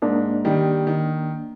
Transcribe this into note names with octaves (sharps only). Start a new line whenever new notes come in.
G#2 A#3 D4
D#3 G3
D#3